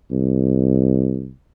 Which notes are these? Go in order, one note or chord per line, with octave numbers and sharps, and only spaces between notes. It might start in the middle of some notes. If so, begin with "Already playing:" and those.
C2